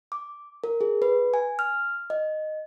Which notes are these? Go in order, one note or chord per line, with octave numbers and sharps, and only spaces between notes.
D6
A#4
G#4
B4
G#5
F6
D#5